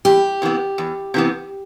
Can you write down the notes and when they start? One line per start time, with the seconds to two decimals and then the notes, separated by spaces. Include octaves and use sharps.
0.05 E2 G4
0.42 C3 E3 B3
0.78 E2
1.14 C3 E3 B3